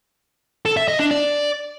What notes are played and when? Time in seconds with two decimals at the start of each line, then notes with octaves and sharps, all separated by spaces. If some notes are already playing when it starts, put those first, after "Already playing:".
0.65 A4
0.77 E5
0.88 D#5
0.99 D4
1.11 D5